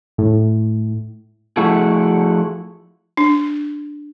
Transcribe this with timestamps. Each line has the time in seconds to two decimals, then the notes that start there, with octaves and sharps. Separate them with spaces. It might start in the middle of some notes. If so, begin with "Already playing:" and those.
0.18 A2
1.57 F3 A3 E4 F#4 G#4 A4
3.17 D4